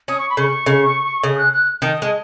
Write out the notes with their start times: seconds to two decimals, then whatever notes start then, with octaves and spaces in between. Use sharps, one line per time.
0.08 C#4 D#6
0.19 C#6
0.30 B5
0.37 C#3 C#6
0.66 C#3
1.23 C#3 D#6
1.38 F#6
1.53 F#6
1.82 D#3 D#6
2.02 G#3